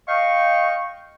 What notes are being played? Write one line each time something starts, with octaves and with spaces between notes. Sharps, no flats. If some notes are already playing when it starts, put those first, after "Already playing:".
D#5 F5 G5 C#6